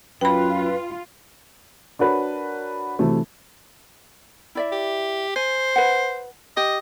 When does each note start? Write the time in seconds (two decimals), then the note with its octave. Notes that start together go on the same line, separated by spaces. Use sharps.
0.21 F#2 F4 B4 G5 B5
1.99 D4 F#4 A#4 B4 C#5
2.99 C3 E3 F#3 A3 C4
4.55 E4 D5 E5
4.72 G4
5.36 C5 G#5
5.76 B4 F#5
6.57 G4 D#5